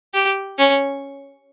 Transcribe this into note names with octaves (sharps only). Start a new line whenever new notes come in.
G4
C#4